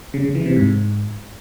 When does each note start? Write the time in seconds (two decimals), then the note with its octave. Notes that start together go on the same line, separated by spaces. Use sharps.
0.14 C#3
0.24 C#3
0.35 E3
0.46 C3
0.56 G#2